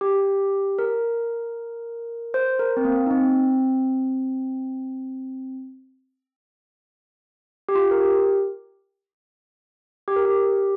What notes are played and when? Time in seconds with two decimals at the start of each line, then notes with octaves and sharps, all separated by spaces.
0.01 G4
0.79 A#4
2.34 C5
2.59 A#4
2.77 C4
2.85 A#3
3.06 D#4
3.11 C4
7.69 G4
7.75 F4
7.91 A#4
8.01 G4
10.08 G4
10.16 A#4
10.25 G4